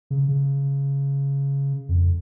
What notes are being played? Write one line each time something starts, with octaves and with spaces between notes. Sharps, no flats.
C#3
C#3
F2